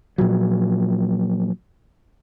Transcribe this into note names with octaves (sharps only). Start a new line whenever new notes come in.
A#2 F3 F#3